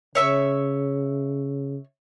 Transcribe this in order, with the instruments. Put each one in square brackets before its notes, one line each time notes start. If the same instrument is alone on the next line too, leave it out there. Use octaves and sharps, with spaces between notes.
[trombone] C#3 [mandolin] C#5 E5 C#6